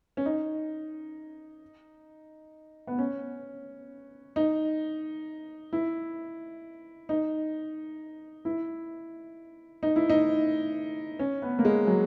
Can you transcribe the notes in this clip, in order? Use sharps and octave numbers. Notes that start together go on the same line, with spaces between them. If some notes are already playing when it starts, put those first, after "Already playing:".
C#4
D#4
B3
C#4
D#4
E4
D#4
E4
D#4
E4
D#4
C#4
B3
A#3
G#3
F#3